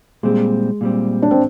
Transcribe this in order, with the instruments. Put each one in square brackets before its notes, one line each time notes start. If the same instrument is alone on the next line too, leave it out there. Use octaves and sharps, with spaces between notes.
[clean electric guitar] A#2 G3 C4 [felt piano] G#3
[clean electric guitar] A#2 G3 C4
[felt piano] D4
C4